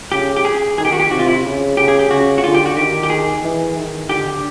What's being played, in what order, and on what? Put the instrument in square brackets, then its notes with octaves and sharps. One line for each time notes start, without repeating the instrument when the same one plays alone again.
[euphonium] C#3 [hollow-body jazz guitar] G4
[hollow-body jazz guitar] G4
G#4
[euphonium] D#3 [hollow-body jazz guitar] G#4
[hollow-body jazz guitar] G4
F#4
G4
[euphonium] C3 [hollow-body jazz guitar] F#4
[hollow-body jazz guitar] F4
E4
[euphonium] C#3
[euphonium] C#3 [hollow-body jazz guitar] G4
[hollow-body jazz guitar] G#4
G4
[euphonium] C#3 [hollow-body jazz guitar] F#4
[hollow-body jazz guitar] F#4
[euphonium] D3 [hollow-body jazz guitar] F4
[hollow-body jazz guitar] G4
F#4
[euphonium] D#3 [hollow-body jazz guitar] G4
[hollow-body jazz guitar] G4
G#4
[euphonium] E3
D#3
[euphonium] D3 [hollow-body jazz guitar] G4